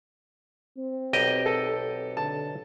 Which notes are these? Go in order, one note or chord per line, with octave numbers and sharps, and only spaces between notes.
C4
B1 G4 D#5
A4
D3 A5